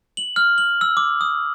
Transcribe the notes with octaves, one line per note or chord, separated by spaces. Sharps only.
F#7
F6
F#7
E6
D6
D#6